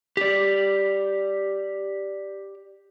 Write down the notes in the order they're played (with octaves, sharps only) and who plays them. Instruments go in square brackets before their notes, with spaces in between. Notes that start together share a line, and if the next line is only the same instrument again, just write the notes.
[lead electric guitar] G4 D5